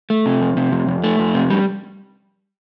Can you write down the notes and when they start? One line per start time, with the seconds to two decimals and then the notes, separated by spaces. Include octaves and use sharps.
0.10 A3
0.26 C3
0.41 F2
0.57 C3
0.72 F2
0.87 F2
1.04 A3
1.19 F2
1.35 C3
1.50 G3